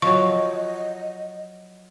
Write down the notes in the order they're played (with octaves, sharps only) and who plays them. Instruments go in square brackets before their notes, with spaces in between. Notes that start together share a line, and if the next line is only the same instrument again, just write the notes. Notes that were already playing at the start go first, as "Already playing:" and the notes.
[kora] F3 F#3 [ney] D#5 [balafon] C#6